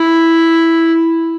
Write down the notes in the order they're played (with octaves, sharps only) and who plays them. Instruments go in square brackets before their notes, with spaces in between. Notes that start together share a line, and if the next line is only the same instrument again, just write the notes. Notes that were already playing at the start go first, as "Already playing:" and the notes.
Already playing: [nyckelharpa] E4